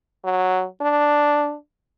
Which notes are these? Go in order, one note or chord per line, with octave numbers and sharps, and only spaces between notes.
F#3
D4